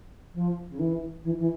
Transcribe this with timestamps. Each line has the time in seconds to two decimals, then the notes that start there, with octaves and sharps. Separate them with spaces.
0.34 F3
0.69 C#3
0.79 E3
1.23 E3
1.38 E3